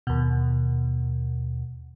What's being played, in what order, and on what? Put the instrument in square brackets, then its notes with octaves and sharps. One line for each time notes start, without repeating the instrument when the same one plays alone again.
[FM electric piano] D#2 B2